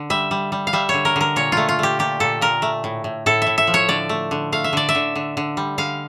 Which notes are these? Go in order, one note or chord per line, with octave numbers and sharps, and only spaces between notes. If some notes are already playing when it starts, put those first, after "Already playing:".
Already playing: D3
G3 E5
G3
G3
F5
G3 E5
D3 C#5
A#4
D3 A#4
A#2 C#5
A3 F4
F4
A3 G4
A#2 G4
A#2 A4
A#2 A#4
A3
A2
A2
A2 A4
A2 E5
E5
F3
C#5
D3 D5
A3
D3
A3 F5
E5
D3 D5
E5
D3
D3
D3
G3
D3 F5